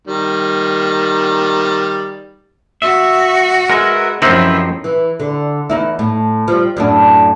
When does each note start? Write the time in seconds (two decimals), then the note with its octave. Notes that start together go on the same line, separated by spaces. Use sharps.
0.07 D#3 G3
2.82 F#4 E5
3.70 G#3 A#4 B4 E5
4.22 F#2 E3 F3 C4 D#4 E4 G4 F6
4.84 E3
5.20 D3
5.70 E2 D#4 E4
5.99 A2
6.48 F3 G3
6.77 F#2 A2 D4